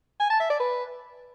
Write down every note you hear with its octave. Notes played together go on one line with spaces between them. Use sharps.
G#5
A5
E5
D5
B4